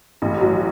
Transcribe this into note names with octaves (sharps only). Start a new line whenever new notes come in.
A1
F#3